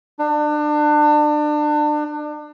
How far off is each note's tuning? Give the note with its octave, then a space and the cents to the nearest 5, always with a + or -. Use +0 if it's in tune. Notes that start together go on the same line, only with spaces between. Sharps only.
D4 +30